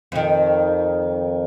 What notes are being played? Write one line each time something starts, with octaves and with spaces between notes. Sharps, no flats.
F2 D#3